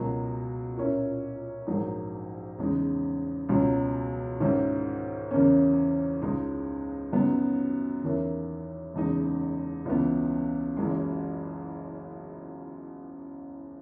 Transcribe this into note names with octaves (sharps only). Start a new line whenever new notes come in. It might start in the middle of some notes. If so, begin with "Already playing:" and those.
Already playing: C#2 B2 F#3 A#3
A#2 A#3 C#4 E4
A#1 G#2 F#3 A#3 D#4
E2 C#3 G#3 D#4
C#2 B2 F#3 C#4
G#2 D#3 A#3 C#4 E4
E2 C#3 E3 A#3 C#4
C#2 C#3 G#3 D#4
F#2 C#3 F#3 B3 D#4
E2 D#3 A#3 C#4 E4
F#1 E2 C#3 G#3 D#4
C#2 C#3 E3 B3
F#1 F#2 E3 G#3